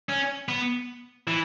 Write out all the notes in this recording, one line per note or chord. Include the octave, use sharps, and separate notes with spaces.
C#4
B3
E3